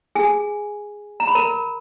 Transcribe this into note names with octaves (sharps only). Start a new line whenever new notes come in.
G#4 G#5
A#5
B5
A#4 A#5